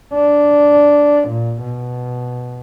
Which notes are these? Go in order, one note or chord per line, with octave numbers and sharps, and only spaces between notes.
D4
A#2
B2